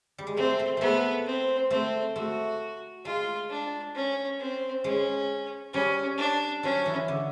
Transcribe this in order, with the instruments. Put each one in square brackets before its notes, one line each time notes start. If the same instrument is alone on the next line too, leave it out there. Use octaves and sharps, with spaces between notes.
[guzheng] G3
G#3
[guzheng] A3 [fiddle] C4
[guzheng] A3
[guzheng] G#3 A3 [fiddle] B3
[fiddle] C4
[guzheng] A3 [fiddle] C4
[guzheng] A3 [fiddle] F#4
[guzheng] G#3 [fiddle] F4
[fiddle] D4
C#4
C4
[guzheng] G#3 [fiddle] C#4
[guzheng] G3 [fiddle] C#4
[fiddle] D4
[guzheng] F#3 [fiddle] C#4
[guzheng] E3
D3